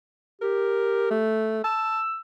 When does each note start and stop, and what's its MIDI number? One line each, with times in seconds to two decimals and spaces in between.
0.42 1.21 67
0.42 1.08 70
1.11 1.60 57
1.64 2.01 81
1.64 2.21 88